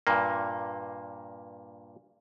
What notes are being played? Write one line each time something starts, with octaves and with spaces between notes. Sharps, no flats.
G2 A#2 A#3